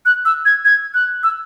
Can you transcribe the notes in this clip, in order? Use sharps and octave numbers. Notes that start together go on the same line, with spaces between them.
F#6
E6
G#6
G#6
F#6
E6